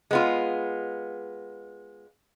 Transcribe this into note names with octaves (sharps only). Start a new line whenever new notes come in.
G#3 B3 F4